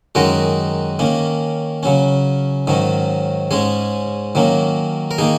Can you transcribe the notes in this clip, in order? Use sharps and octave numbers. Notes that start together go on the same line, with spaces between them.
F#2 D#3 G#3 D#4 F#4 A#4
D#3 A#3 C#4
C#3 F#3 C#4
G#2 D#3 F#3 C#4
G#2 G#3 C#4 G#4
D#3 F#3 A#3 C#4
A#4
D#3 A#3 D#4 G#4